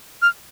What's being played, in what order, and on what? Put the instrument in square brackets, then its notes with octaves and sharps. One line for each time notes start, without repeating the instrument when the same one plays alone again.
[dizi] F6